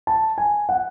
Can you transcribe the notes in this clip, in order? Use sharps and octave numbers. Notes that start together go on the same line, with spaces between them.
A5
G#5
F#5